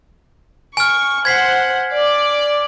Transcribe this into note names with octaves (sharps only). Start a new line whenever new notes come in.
G#5 C#6 F6
C5 F#5 G#6 B6 C7
D5